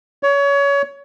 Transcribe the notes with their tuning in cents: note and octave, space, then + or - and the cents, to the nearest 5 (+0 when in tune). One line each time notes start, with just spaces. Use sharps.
C#5 +25